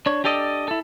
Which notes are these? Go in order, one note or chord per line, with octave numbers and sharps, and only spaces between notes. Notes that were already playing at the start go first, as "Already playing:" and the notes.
D4 C#5
D4 G4 A4 D5 D#5
E4 A4